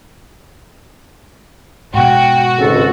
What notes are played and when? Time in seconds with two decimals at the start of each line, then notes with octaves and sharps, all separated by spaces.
1.94 G#2 B2 F#4 G5
2.57 G#1 C#2 A4